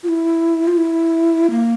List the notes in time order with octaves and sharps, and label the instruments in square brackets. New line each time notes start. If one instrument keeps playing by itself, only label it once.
[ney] F4
E4
F4
E4
A#3